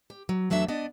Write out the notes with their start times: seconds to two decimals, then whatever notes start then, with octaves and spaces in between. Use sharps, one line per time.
0.10 G4
0.29 F#3
0.50 E2 F#3 A3 D4 E5
0.68 B3 D4 D5 D#5